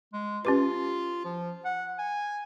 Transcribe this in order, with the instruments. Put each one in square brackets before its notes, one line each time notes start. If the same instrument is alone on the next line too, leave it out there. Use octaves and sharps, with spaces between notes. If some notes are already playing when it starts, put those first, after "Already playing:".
[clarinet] G#3
[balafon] C#4 G4 B4 [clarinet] F4
[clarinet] F3
F#5
G#5